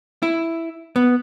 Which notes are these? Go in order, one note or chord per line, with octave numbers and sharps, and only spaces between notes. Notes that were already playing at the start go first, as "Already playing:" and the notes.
E4
B3